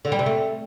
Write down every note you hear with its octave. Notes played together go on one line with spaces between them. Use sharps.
D3
G3
C3
A3